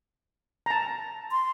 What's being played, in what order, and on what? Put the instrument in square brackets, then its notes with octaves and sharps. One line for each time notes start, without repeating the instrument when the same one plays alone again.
[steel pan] A5 A#5
[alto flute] C6